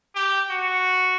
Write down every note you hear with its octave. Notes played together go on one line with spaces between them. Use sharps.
G4
F#4